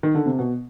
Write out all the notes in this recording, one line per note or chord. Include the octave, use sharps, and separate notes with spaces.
D#3
D3
C3
B2